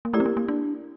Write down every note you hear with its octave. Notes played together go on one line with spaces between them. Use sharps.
A#3
A3 E4 G4 A#4 D5
C4
A#3
A#3
D4